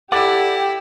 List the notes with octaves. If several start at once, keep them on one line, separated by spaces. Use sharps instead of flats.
E4 G4 A4 D5 F#5 D6 A6